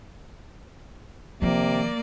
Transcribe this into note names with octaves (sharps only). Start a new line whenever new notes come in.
C3 D#3 F3 A#3 D5